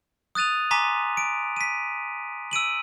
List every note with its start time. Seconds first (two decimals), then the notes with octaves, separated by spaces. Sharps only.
0.35 D#6 F#6 A6 D#7 F7
0.71 G#5 A#5 C6 D6 B6 D#7
1.17 D7
1.56 B6 D#7
2.51 E6 D7 D#7 F#7